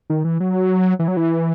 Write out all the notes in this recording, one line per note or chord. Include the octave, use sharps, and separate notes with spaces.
D#3
E3
F#3
E3
F#3
E3